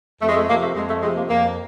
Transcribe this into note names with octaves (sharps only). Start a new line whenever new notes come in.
F2 A3
G#3
A3
C3 F3 A#3
A3
F2 G#3
A3
C3 F3 G#3
A#3
F2 A#3